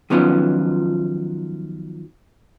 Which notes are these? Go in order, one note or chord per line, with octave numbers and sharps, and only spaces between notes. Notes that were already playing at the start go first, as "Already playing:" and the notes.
D#3 F3 F#3 B3 C#4 F4